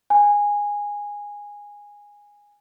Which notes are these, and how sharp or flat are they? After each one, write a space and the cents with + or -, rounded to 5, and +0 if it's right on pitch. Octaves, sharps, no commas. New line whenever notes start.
G#5 -10